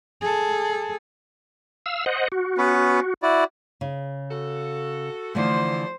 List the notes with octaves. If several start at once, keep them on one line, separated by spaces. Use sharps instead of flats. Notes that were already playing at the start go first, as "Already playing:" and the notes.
G#4 A4
F5 E6
C5 D#5 F#5
F#4
B3 C#4 B4
E4 F#4 D5
C#3
F#4 A4
D3 E3 F3 A3 C5